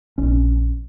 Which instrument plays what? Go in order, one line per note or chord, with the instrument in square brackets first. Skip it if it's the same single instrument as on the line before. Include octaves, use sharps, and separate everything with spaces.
[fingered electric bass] A#1 C#4